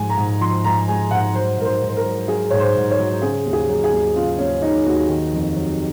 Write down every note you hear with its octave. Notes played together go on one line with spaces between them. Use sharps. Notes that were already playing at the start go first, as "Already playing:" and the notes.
Already playing: G#2 F3 G#3 G#5
A#5
G#2
F3 C6
G#2 A#5
G#3 G#5
G#2 F#5
F#3 C5
G#2 A#4
C5
G#2
C5
A#4
F#3
F#3 G#4
G#2 C#5
C5
G#2
C#5
F#3
C#3 G#4
D#2
G#4
F#3
G#4
D#2
C#3 F4
D#2 C#4
F#3 D#4
D#2 F#4
D#3
F2
F#3